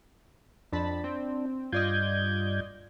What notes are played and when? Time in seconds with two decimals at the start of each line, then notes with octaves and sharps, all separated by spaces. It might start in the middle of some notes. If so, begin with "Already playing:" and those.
0.72 F2 D4 A5 B5
1.04 C4
1.72 G2 F4 D5 D#5 G6 G#6